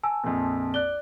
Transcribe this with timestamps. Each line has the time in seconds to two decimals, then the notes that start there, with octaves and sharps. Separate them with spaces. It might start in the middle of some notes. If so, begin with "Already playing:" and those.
0.03 G#5 A5 E6
0.24 A#1 F2
0.74 D5 F#6 G7